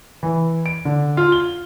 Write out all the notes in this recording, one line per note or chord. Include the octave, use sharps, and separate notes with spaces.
E3
D7
D3
F4
G7